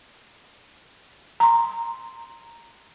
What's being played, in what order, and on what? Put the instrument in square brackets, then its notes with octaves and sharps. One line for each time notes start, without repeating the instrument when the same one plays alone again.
[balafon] A#5 C6